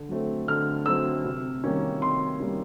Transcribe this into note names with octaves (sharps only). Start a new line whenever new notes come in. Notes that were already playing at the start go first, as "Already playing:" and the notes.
Already playing: D3
F#3 A3 C4
D3 F6
F#3 A3 C4 E6
C3
D#3 G3 A#3 C#4
C3 C6
D#3 G3 A#3 C#4